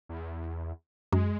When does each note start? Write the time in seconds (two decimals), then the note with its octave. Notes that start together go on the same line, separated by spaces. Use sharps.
0.09 E2
1.12 F#2 G#3